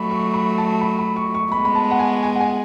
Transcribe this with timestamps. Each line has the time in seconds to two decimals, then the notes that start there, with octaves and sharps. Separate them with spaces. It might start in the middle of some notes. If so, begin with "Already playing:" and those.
Already playing: F#3 A3 B5 C#6
0.11 C#6
0.34 B5
0.58 A5
0.81 B5
0.99 B5
1.16 C#6
1.34 C#6
1.52 G#3 B3 B5
1.65 B5
1.75 A5
1.91 F#5
1.99 G#5
2.23 G#5
2.35 F#5
2.40 G#5